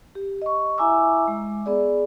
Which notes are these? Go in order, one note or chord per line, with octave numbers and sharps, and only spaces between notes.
G4
D#5 C#6
E4 E5 G#5 A#5 D6 E6
G#3
B3 G#4 D5